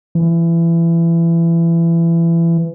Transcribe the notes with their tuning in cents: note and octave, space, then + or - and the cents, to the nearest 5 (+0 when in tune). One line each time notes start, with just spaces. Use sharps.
E3 +25